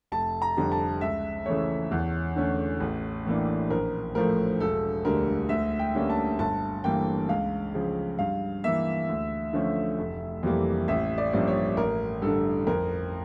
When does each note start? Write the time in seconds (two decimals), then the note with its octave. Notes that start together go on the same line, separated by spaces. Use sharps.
0.12 F1 A5
0.42 A#5
0.57 F2 D3 G3
0.72 A5
1.01 C#2 E5
1.46 C#3 E3 A3 C#5
1.91 E2
2.36 D3 A3 C#4
2.80 A1
3.25 A2 E3 A#3 D4
3.70 A#1 A#4
4.15 A2 F3 A3 A#4
4.60 E1 A4
5.05 D2 D3 G3 A#4
5.49 D2 E5
5.79 G5
5.95 D3 G3 A#3 C#4
6.10 A5
6.39 G1 A5
6.84 G2 E3 A#3 G5
7.29 C#2 F5
7.74 C#3 F3
8.19 G2 F5
8.64 E3 A#3 E5
9.09 D2
9.53 D3 F3 A3 C#4
9.98 F1
10.43 F2 E3 G3 A#3
10.88 A1 E5
11.18 D5
11.33 G2 F3 A#3 C#4
11.48 C#5
11.77 A1 A#4
12.22 G2 D3 A4
12.67 F2 A#4